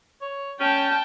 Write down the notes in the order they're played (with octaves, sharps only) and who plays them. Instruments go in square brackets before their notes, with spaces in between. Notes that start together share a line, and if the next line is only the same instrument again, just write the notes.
[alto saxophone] C#5
[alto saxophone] C#4 [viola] G5 A5